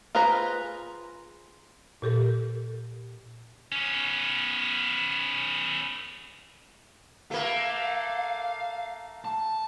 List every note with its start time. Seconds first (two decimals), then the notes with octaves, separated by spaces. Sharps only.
0.15 F4 G#4 B4 C5 A#5
2.02 A#2 G4 A4 A#4
3.72 B3 C#4
7.31 A3 A#3 F5
9.25 A5